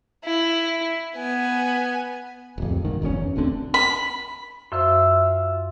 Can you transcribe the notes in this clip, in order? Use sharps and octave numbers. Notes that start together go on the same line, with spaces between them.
E4
B3 G#5
D1 F2
B1 G#2 D#3
F#1 E2 C#3 C#4
D#1 D2 D3 C4
B5
F#2 F4 C5 E5 C6